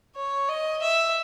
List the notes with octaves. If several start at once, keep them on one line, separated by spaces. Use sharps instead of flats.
C#5
D#5
E5